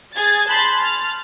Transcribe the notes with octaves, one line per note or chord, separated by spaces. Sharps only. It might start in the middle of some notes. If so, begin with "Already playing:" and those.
G#4 G#6 A6
A5 B5 C6 F#6 G6 A6
F6 A6